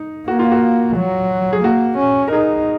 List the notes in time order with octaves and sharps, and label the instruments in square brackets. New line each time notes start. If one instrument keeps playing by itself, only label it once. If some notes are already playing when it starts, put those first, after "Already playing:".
Already playing: [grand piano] D#4
[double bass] A#3 [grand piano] F#4
[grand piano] F4
F#4
[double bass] F#3
[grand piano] G#4
[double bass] A#3 [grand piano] F#4
[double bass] C#4
[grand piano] A#4
[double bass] D#4 [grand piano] G#4